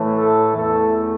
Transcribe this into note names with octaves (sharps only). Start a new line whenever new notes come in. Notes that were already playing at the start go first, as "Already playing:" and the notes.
Already playing: A2 E3 A3
A4
E2 E3 A3 A4